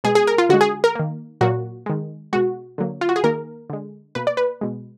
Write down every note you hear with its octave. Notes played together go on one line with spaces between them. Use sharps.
B2 G#3 G#4
G#4
A#4
F4
D3 G#3 F#4
G#4
A#4
D#3 A#3
A#2 F#3 A#3 F#4
D#3 G#3
B2 G#3 F#4
D3 F#3 A#3
F4
F#4
G#4
D#3 A#3 A#4
D3 G#3
B2 A#3 B4
D5
B4
B2 G#3